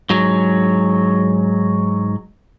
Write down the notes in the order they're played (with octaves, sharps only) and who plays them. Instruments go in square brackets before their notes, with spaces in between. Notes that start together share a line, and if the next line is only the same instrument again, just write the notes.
[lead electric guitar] G#2 F#3